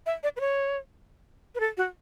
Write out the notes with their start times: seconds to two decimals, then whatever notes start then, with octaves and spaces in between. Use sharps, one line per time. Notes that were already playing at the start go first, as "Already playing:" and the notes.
0.06 E5
0.23 D5
0.36 B4
0.40 C#5
1.55 B4
1.60 A4
1.77 F#4